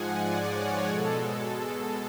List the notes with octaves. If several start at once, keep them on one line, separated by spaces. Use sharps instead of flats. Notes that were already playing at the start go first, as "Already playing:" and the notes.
Already playing: G#2 F3 G#3 F#5 G#5
D5
C#5
B2 G#3 A4